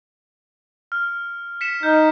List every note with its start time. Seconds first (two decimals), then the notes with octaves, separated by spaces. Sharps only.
0.92 F6
1.61 B6 C#7 E7
1.83 D#4 F6 G6